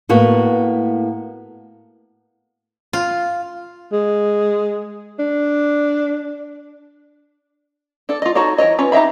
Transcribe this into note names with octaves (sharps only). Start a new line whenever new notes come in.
A2 A#3 B3 F#4
F4
G#3
D4
D4 A4
F4 D#5
D#4 F#4 A4 C#5 D#5
E3 A#4 C#5 D#5
C#4 F4 B4 C#5
D#4 G4 D#5 E5 B5